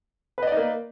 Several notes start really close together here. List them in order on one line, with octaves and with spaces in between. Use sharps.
B4 D#5 D5 D#4 A#3